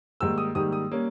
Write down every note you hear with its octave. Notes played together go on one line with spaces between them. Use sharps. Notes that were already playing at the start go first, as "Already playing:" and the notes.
G#2 D#3 G3 A#3 E6
D#6
G#2 D#3 G3 A#3 D#6
D#6
G3 A#3 C#4